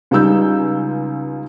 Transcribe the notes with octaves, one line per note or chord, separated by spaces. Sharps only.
C#2 G3 D#4 E6 G6